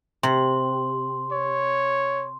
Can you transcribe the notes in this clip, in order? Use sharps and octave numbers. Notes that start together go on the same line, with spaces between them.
C3 C6
C#5